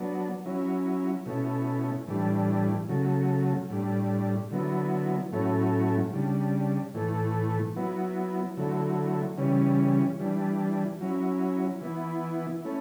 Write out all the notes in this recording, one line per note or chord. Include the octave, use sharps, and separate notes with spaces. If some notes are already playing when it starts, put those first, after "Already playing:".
Already playing: F#3 B3 D4
F#3 C#4 E4
B2 A3 C#4 E4
A2 E3 G3 D4
C#3 F#3 A3
A2 G3 D4
D3 F#3 B3 E4
A2 F#3 A3 C#4 E4
C#3 G3 D4
A2 E3 A3
F#3 B3 E4
D3 F#3 A3 E4
C#3 E3 G3 C#4
E3 G3 D4
F#3 C#4 E4
E3 B3 E4
A3 C#4 E4